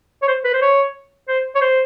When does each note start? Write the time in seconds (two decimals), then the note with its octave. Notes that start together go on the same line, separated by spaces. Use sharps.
0.22 C#5
0.28 C5
0.44 B4
0.54 C5
0.62 C#5
1.28 C5
1.55 C#5
1.61 C5